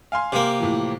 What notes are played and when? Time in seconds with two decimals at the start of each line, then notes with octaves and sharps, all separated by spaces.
0.12 F5 G#5 C6
0.32 C3 A#3
0.59 A2 E3 F3